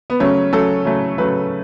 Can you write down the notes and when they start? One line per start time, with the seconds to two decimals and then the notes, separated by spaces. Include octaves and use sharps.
0.10 B3
0.20 C#3 F#3 A3 C#4
0.52 C#3 F#3 A3 A4
0.85 C#3 F#3 A3
1.18 C#3 F#3 A3 B4